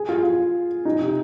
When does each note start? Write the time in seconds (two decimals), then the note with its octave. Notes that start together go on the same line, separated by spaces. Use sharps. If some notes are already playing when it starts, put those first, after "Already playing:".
Already playing: G#4
0.09 F4
0.23 F4
0.85 D#4
1.00 C3